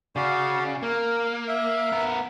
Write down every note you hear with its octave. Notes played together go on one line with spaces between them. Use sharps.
C#3 F#4 D5 F5
A#3 A#4
E5
B3 A#4